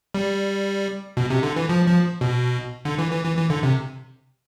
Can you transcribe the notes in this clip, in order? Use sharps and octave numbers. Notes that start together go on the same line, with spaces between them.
G3
B2
C3
D3
E3
F3
F3
B2
D3
E3
E3
E3
E3
D3
C3